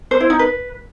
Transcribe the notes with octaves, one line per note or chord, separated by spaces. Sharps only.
C5
E4
D#4
B4